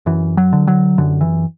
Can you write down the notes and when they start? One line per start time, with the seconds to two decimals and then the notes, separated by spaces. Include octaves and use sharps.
0.06 F#2 E3
0.37 F#3
0.53 D3
0.67 F#3
0.98 F#2 D3
1.21 E3